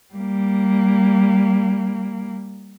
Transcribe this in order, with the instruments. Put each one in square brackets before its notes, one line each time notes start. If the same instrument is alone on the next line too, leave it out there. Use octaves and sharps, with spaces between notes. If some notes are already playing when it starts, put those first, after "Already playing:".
[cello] G3 A#3